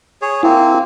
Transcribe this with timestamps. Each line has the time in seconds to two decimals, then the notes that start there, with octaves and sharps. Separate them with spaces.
0.22 G#4 C#5
0.43 A#3 C4 E4